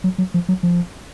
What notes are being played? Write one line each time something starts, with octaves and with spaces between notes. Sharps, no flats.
F#3
F#3
F3
F#3
F3